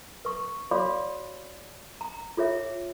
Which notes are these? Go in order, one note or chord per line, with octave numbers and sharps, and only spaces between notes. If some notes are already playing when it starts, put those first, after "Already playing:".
B4 C#6
F#4 C#5 D5 F5 B5 D6
A#5
F4 G#4 C#5 E5